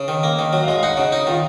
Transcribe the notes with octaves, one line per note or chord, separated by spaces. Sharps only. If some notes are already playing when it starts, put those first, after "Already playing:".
Already playing: C#3
D#3
A#3
D#3
F#3
F5
G#3 D#5
F5
D#4 F#5
C#3 D#5
D#4
D#3 F4